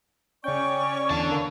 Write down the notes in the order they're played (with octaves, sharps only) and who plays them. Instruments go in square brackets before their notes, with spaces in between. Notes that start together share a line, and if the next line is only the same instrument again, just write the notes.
[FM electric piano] C#3 G5 [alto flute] C#4 [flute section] D5 C#6
[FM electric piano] E2 [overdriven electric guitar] D3 A5
[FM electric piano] A#3